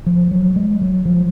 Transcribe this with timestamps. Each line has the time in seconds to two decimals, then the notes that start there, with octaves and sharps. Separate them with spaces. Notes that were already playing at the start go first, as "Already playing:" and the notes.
0.06 F3
0.31 F#3
0.56 G#3
0.81 F#3
1.05 F3